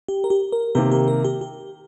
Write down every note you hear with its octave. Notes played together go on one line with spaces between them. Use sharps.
G4
A#4
G4
A#4
C3 D#3 A#3 G4
G4
A#4
G4
G4